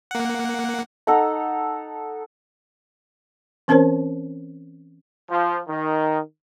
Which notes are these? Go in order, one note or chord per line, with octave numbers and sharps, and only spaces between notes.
A#3 F#5
D#4 A4 F#5 A#5
E3 C4 C#4 A#4 C5 C#5
F3
D#3